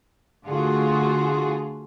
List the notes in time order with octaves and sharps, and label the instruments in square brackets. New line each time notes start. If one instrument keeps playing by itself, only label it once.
[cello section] D3 A3 F4 F#4 G#4